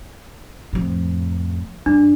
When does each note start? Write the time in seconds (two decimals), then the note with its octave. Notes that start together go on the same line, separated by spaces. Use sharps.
0.73 F2 A2
1.86 G2 D4